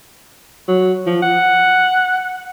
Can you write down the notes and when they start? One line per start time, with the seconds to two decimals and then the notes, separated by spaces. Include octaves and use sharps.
0.68 F#3
1.06 F3
1.22 F#5